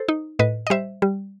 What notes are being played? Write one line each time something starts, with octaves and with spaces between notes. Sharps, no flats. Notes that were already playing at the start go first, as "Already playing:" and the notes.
Already playing: A4 C5
D#4
A2 B4 D#5
D#5
G3 C5 E5
G3